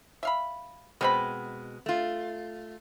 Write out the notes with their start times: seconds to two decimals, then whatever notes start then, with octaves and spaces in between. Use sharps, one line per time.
0.23 E5 F5 B5
1.01 B2 G#3 B3 C4 B5
1.86 A3 F4